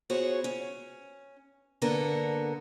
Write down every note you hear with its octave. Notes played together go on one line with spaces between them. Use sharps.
B3 F#4 G#4 C5 C#5
C#4
G2 D3 A#3 B3 A4 A#4